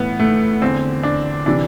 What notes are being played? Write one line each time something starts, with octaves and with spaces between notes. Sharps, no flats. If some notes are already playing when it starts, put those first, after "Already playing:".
Already playing: A2 E3 B3
A3
E2 D3 C4
D4
C3 E3 D4